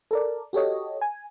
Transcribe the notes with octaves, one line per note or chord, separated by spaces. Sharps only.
A4 A#4 D5
F#4 G4 A4 C#5 D#5
G#5